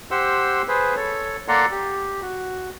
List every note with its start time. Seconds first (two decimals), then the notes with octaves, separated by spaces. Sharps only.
0.11 G4 C5 F#5 C6 E6
0.68 G#4 B4 C5
0.96 A4 C#5
1.48 A#3 A4 D5 F#5 A#5 C6
1.71 G4
2.22 F#4